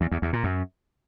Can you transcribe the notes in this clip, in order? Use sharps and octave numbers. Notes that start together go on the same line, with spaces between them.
E2
E2
E2
A#2
F#2